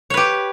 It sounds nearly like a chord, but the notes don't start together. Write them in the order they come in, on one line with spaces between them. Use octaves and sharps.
C#5 B4 G4